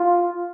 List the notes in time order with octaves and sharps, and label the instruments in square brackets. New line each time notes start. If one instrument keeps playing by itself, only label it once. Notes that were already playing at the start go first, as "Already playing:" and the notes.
Already playing: [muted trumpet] F4